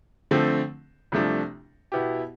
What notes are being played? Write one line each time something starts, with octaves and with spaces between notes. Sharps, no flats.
D3 F3 A3 C4
C2 C3 F3 A3 D4
B2 B3 E4 G4